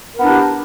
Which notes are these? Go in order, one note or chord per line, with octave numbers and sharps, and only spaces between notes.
B3 D4 E4 G4 A#4